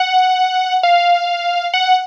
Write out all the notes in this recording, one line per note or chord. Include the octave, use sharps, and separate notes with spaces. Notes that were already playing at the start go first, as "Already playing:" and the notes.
Already playing: F#5
F5
F#5